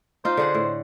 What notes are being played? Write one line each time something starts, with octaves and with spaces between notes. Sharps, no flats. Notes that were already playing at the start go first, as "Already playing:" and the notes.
D#4 F4 C5
D3 G#4 F#5
A2